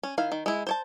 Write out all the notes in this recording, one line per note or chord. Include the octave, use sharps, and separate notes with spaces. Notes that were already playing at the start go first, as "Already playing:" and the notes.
C#4
D#3 E4 F5
D#3
G#3 E4
C5 C#5 A5